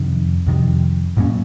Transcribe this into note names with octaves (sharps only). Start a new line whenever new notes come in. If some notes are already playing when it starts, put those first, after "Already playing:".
Already playing: F2 C3 D#3
F2 C3 D#3
A2 F#3 A#3 C#4